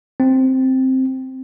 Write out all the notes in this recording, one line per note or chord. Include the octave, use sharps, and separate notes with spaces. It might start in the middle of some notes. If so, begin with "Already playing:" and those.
C4